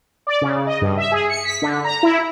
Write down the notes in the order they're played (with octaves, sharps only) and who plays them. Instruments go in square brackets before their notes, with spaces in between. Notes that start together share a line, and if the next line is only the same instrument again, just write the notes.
[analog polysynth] D5
C#3
D#5
G2
E5
G#4
C#7
B6
D3
A#5
E4